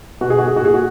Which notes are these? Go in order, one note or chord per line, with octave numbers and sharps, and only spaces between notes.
B2 F#4
G#4
F#4
G#4
F#4
A#2 G#4
F#4